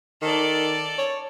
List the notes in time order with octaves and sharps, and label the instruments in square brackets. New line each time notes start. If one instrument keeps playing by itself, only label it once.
[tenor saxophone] D#3 [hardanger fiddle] A4 D5
[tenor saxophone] C#5